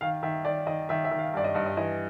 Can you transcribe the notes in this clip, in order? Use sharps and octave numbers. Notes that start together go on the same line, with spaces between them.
D#3 F5
D#3 E5
D#3 D5
D#3 D#5
D#3 E5
E5
D#3
F5
G2 D5
D#5
G2 D#5
D#5
E3 D#5